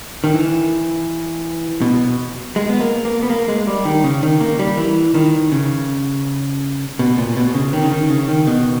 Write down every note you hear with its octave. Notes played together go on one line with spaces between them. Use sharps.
D#3
E3
B2
G#3
B3
A#3
A#3
B3
A#3
G#3
G3
D#3
C#3
D#3
A#3
G3
E3
D#3
C#3
B2
A#2
B2
B2
C#3
D#3
C#3
D#3
C#3
D#3
B2